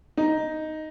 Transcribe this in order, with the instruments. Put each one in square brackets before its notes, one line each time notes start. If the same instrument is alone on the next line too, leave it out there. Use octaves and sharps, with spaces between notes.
[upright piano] D#4